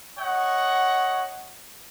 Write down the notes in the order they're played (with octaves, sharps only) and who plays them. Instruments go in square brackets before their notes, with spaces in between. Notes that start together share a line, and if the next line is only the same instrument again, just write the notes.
[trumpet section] C#5 D#5 F#5